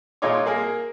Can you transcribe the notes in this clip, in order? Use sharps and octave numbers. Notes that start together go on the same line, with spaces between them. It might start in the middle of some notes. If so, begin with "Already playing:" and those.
A#2 G#3 D#4 F4 C#5 D6
A#3 G#4 A#4